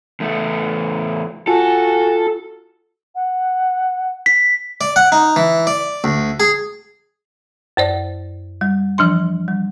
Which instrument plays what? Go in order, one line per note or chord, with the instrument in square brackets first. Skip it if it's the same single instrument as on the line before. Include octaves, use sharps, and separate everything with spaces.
[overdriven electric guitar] E2 A3
[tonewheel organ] F4 A5 [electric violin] F#4 [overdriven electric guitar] A4 [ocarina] G#5
[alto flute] F#5
[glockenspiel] B6
[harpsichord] D5
F#5
D#4
E3
D5
D2
G#4
[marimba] F#2 C5 D5
G3
E3 F3 D4 C6
G3